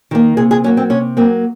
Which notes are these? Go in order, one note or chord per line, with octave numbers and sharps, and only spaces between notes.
D#3 A#3
C3 G#4
G#4
F#3 A#3 C#4
C4
C3 C#4
F#3 A#3 C4